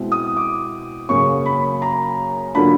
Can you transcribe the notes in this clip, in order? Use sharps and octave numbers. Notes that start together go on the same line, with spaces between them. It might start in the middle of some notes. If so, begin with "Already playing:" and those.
Already playing: B2 G#3 C4 E4
D#6
D6
F#2 C#3 F#3 A#3 C#4 C#6
B5
A#5
D3 F#3 A#3 D4 F4 B5